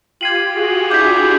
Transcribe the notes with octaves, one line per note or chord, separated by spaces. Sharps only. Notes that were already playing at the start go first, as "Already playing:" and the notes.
F4 G4 G#6 C7 D#7 F#7
F#4 G#4
D4 E4 D6 G6 B6